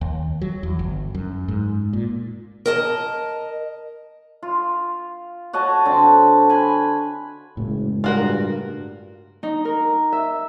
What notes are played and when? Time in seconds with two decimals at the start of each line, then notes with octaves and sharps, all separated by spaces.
0.01 D#2
0.42 F#3
0.63 E2
0.79 G1
1.15 F#2
1.48 G#2
1.93 A#2
2.66 A#4 D#5 A5
4.43 F4
5.53 F#4 C#5 D#5 A5
5.85 D3 C4 A5
6.49 G#5 B5
7.57 F#1 A2 C#3 G#3
8.04 G2 F4 F#4 A#4
9.43 D#4
9.65 A#4
10.12 E5